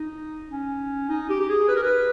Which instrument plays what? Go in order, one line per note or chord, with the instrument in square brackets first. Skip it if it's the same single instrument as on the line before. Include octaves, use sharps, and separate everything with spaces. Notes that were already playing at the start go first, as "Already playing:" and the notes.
Already playing: [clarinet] D#4
C#4
D#4
G4
G4
G#4
B4
A#4
B4